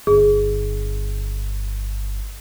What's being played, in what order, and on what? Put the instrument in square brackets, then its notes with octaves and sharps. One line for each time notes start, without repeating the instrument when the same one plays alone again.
[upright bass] G1 [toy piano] G#4